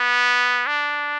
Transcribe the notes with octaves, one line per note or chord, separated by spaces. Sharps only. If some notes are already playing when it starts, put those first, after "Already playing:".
Already playing: B3
D4